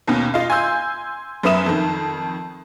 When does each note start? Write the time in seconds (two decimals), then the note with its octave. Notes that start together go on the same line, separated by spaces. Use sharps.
0.08 D#2 B2 C#4
0.34 F4 D#5 F5
0.50 G#5 C6 E6 G6
1.43 F#2 C#4 B4 E5 D#6 E7
1.66 F2 D#3